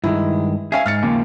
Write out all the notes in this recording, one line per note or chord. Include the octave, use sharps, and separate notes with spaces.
G2 D#3 G#3 E4
C#4 G#4 E5 F5 G#5
G#2 F6 A6 C#7
D#2 C#3 F3 A#3